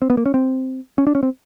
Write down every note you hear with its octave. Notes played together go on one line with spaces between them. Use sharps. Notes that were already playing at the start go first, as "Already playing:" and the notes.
C4
B3
A#3
C#4
C4
C#4
D4
C#4
C4